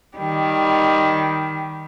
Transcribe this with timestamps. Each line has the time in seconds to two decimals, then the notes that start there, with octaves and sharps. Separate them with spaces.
0.18 D#3 G3